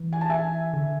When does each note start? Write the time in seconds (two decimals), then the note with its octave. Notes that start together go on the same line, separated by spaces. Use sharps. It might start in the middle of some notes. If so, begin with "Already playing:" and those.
Already playing: E3
0.13 G#5
0.21 A5
0.30 E5 G#5
0.73 D3